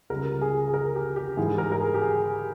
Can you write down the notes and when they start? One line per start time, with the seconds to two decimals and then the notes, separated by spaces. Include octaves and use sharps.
0.10 C#2 C#3 G3 A#4
0.41 G#4
0.68 G#4
0.74 A#4
0.95 G4
1.16 G4
1.37 G#2 E3 G3 G#4
1.58 A#4
1.72 A#4
1.81 G#4
1.94 G4
2.02 G#4